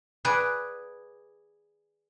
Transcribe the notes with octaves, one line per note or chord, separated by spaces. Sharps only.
G#4 B4 D5 F#5 G#5